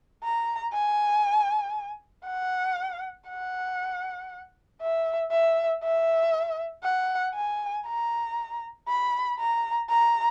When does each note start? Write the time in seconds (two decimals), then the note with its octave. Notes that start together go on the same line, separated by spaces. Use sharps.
0.24 A#5
0.74 G#5
2.27 F#5
3.28 F#5
4.81 E5
5.31 E5
5.83 E5
6.84 F#5
7.35 G#5
7.86 A#5
8.88 B5
9.39 A#5
9.89 A#5